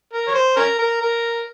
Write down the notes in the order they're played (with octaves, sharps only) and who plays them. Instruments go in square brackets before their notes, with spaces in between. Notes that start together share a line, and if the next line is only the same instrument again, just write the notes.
[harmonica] A#4
C#5
C5
C#4 A#4
A#4
A#4